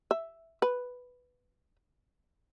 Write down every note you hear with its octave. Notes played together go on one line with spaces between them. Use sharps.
E5
B4